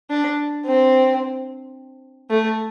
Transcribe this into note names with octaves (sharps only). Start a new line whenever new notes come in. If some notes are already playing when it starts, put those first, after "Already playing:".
D4
C4
A3